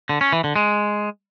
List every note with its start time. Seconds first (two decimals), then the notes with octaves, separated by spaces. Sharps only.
0.09 D3
0.21 C#4
0.32 E3
0.44 D3
0.56 G#3